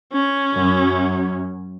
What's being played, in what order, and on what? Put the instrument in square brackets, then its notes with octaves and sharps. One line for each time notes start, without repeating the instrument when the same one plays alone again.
[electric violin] C#4
[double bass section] F#2